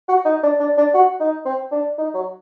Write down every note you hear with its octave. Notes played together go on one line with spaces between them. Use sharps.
F#4
D#4
D4
D4
D4
F#4
D#4
C4
D4
D#4
F#3